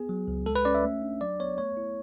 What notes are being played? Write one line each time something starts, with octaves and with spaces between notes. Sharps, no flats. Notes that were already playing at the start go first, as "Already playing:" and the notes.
Already playing: B3 G#4
F#3
C#2
G#3 A4
B4
C#4 D5
E5
A3
D4
F#3 D5
B3 C#5
A3 C#5
E4